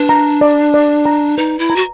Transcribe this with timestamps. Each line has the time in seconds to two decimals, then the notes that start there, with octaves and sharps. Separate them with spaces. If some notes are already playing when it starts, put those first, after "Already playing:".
Already playing: D4 B4
0.09 A#5
0.41 D5
0.74 D5
1.06 A#5
1.37 D#4 B4
1.59 E4
1.70 A#5
1.76 F#4